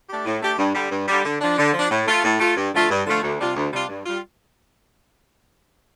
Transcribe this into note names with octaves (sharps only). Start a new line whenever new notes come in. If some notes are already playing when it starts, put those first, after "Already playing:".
A3 D4 G4
A2
A3 D4 G4
G2
D3 G3
G2
D3 G3
D3
F3 D4
D3
F3 D4
A2
A3 F4
A2
A3 F4
G2
D3 F3 A3 F4
G2
D3 F3 A3 F4
D2
C3 G3 D4 F4
D2
C3 G3 D4 F4
G2
G3 F4